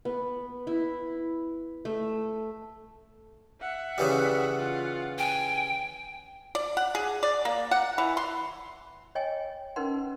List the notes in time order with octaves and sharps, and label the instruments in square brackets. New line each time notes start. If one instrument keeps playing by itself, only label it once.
[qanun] B3
E4
A3
[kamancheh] E5 F#5
[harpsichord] C#3 E3 G3
[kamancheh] F4 F#5
[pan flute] G5 [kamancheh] G#5
[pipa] D5
F#5
G#4
D5
A#3
F#5
E3
C6
[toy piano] C#5 D#5 G5 G#5
C#4 D#4 A#4 B4 F#5 C6